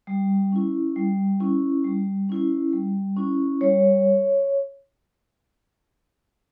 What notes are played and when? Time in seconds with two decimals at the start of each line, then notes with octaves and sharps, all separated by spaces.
0.07 G3
0.52 C#4 E4
0.96 G3
1.41 C#4 E4
1.84 G3
2.29 C#4 E4
2.73 G3
3.16 C#4 E4
3.61 G3 C#5